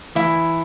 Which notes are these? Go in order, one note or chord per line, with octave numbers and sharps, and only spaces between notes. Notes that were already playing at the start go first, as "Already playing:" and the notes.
E3 E4